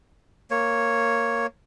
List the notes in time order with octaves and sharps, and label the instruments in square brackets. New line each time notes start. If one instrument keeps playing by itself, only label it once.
[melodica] A#3 C#5